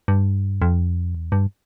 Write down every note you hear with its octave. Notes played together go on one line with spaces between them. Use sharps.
G2
F2
E2
G2